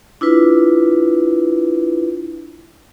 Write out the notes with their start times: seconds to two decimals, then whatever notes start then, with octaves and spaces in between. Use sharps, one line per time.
0.21 D4 E4 F4 B4